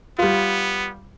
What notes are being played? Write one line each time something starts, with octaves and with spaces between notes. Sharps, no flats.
G3 B3 F4